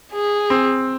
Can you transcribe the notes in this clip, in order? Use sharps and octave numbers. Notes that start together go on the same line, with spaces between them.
G#4
C4